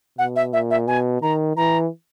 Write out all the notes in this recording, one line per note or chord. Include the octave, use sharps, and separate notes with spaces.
B2 F#5
E5
A#2 E5
E5
B2 G#5
D#3 A#5
E3 A#5